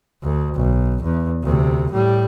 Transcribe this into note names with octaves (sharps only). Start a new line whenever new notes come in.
D2
B1
E2
D2 C3
A2 G3